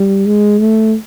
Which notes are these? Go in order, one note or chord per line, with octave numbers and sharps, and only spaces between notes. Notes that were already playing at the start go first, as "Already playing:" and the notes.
Already playing: G3
G#3
A3